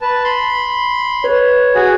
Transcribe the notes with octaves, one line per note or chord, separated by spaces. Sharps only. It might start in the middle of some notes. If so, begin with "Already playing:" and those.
B4 A5
B5 C6
B4 C#5
F#4 G#4